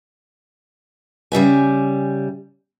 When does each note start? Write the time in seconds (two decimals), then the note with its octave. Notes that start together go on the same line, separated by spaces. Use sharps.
1.32 C#3 G3 E5 G#5